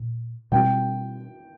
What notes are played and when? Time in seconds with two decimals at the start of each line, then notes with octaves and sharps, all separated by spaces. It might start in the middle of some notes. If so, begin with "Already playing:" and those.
Already playing: A#2
0.52 B2 G3 C4 G5